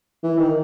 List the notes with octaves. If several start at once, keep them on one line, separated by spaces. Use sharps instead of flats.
E3
D#3